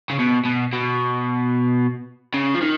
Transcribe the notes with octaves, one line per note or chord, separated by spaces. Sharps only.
C#3
B2
B2
B2
C#3
F3
D#3